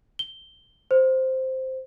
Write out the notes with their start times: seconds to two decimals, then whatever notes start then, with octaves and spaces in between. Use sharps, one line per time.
0.19 G7
0.91 C5